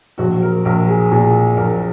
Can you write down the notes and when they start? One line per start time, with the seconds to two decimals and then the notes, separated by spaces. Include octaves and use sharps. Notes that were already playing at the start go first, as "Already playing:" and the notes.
0.18 A#1 F#4
0.42 A#4
0.65 A#1 A#4
0.88 G#4
1.12 A#2 G#4
1.57 A#1 A#4